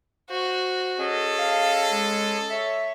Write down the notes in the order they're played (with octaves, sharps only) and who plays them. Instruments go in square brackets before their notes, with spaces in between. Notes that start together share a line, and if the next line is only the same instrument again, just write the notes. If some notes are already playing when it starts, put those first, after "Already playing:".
[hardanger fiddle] F#4 [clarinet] C5
[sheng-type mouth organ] C#4 G#4 D#5 [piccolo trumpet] A4
[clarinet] F5 [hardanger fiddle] A5
[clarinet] G#3
[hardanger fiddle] C#5 [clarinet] E5